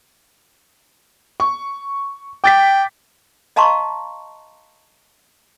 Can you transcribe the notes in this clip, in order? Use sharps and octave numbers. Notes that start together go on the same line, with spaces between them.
C#6
G5 D6 A6 B6
D#5 F5 A5 A#5 C6 C#6